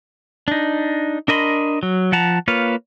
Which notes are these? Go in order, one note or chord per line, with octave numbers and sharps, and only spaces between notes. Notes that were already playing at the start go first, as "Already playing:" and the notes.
D4 D#4
D4 A#4 D#5 B5 C6
F#3
F3 F#5 A5 A#5
A#3 F4 B4 C#5 F5